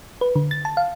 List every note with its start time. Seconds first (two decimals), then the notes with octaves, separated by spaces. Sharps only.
0.21 B4
0.36 D3
0.51 A6
0.65 A5
0.77 F5